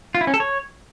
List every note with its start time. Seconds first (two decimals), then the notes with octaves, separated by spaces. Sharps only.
0.15 F4
0.21 E4
0.27 C#4
0.34 A4
0.40 C#5